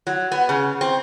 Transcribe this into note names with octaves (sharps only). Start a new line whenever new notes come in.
F#3
B3
C#3
C4